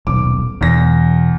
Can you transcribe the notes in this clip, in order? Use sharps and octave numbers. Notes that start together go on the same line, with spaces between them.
D#1 B1 D6
E1 E2 A#6